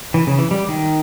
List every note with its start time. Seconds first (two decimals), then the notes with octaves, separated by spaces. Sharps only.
0.14 E3
0.27 C#3
0.38 E3
0.51 G3
0.69 D#3